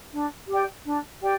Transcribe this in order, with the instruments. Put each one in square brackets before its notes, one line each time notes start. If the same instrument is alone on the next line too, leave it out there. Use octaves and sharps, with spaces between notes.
[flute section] D4
G4 D5 G5
D4
G4 D5 G5